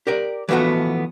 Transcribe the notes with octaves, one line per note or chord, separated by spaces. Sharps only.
G4 A#4 D5
E3 F3 A3 B3 F#4